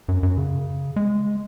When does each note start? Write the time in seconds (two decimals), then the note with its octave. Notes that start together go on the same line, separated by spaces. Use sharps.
0.08 F#2
0.23 F#2
0.38 C#3
0.96 G#3